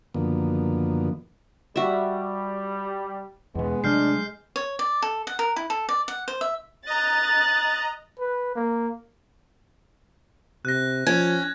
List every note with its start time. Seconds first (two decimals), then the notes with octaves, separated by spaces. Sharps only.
0.14 F#2 D3 D#3 F3 A#3 B3
1.76 G3 F#4 E5
3.55 E2 B2 G#3 B3
3.84 C3 F#3 A3 D4 F6 G6 C7
4.56 C#5
4.79 D5
5.02 A4
5.27 F#5
5.39 A#4
5.56 E4
5.70 A4
5.89 D5
6.08 F#5
6.28 C5
6.41 E5
6.86 D#5 A#5 F#6 A6
8.19 B4
8.56 A#3
10.65 C3 F#6 A#6
11.07 F3 C#4 G#6